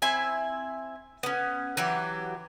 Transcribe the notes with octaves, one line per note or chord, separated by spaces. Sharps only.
C4 E4 E5 G#5
B3 C#4
E3 F#3 G4